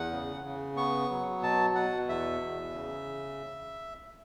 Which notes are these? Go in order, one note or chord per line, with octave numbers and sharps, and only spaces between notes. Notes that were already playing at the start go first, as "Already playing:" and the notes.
Already playing: E2 F#5
C#3
C#3
B3 C#6
F#3
B2 A5
B2 F#5
E2 E5
E2
C#3